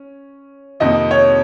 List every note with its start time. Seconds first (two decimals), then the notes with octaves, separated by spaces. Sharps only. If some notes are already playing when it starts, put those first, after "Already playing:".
Already playing: C#4
0.80 F2 C3 D#3 A#3 D#5
1.11 C#5